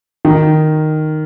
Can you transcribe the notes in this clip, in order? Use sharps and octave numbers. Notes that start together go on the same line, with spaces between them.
D#3